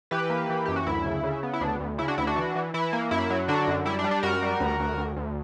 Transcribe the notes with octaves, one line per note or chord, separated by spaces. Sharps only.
E3 G4 B4
A#3
E3
F#2 G4
F#4
D2 E4
C#3
C#3
B3
E4
D2 D4
D2
C#3 E4
D4 F#4
D2 E4
D4 F#4
E3
E3
E3 E4
A#3
F#2 E4
F#3
D3 D4 F#4
F#2
G3 E4
D4
G3
D4
F#2 F#4 A#4
G3
D2
D2
D2
D2